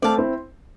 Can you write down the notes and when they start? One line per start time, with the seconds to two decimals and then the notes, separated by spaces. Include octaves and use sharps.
0.02 A3 C4 D5 F5 A5
0.18 C4 E4